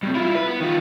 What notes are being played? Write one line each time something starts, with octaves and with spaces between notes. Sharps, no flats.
G2 C3
E4 F4
B4
B3
D#3 F4